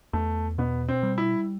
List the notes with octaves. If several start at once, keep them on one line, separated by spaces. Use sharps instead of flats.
E2 A3
B2 B3
C4
G3
E4